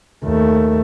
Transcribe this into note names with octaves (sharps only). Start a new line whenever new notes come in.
D#2 A3